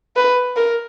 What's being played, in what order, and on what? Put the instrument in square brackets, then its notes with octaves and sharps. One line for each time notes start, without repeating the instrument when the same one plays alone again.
[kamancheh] B4
A#4